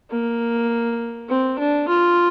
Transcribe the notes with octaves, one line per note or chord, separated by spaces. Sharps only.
A#3
C4
D4
F4